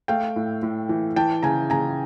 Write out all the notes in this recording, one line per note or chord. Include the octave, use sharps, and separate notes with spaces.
A3 F5 G5
A2
A2
E3
E3 G5 A5
C#3 G#5 A#5
C#3 G#5 A#5